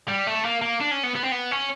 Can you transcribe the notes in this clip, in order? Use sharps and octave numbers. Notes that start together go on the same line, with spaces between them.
G3
A3
A#3
A#3
D4
C#4
B3
B3
C4
B3
C#4